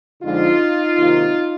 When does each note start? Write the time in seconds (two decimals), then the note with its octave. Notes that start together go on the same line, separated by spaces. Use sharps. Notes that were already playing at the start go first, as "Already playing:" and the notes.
0.23 F2 D3 F3 G#3 D#4 F4
0.97 C3 D#3 F#3 A#3